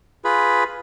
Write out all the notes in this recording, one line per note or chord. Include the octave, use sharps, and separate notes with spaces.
F4 G#4 B4 B5